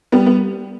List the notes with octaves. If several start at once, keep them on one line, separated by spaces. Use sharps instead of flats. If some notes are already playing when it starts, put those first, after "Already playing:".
G3 B3
B3